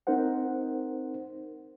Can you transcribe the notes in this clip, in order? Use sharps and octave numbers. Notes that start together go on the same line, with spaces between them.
C4 D#4 A#4 C5 F#5